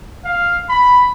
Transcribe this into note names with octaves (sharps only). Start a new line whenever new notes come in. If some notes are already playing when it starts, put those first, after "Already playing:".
F5
B5